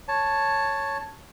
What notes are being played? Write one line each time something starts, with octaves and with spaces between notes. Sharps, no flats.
C#5 A5